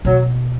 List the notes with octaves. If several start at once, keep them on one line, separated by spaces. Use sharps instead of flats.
B2 F#3